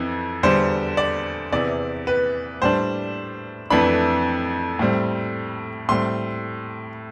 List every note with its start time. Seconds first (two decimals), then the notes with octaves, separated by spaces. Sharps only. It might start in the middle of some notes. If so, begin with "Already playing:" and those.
Already playing: F2 E3
0.43 E2 D3 G3 C5
0.97 D5
1.52 E2 C3 E3 D5
2.07 B4
2.62 A2 G3 D4 C5
3.70 F2 E3 A3 D4 B5
4.79 A2 G3 C4
5.89 A2 G3 C4 C6